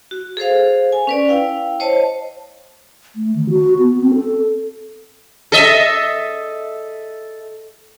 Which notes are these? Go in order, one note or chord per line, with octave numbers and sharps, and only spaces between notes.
F#4
G#4 A4 C5 F5
G#5
C#4 B4 D5
E4 F5 G5
C5 C#5 D#5 A5
A3
D#3
F#4
B3
C4
A4
A4 D#5 E5